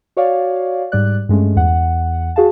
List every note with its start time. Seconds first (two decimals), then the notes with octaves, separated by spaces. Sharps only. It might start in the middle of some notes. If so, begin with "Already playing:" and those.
0.17 F#4 C#5 D5 F5
0.92 G#2 G3 D5 F#6
1.29 G2 G#3 A3 C#4
1.56 E2 F#5
2.36 F#4 G#4 F5 A5